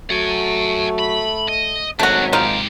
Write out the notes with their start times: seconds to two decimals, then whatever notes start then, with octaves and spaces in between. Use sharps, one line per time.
0.11 F#3 A3 F#5 G#5
0.98 B5
1.48 D#5
1.99 G#1 F#3 A3 C#4 D4 F#4
2.33 G#2 D#4 F4 G4 F5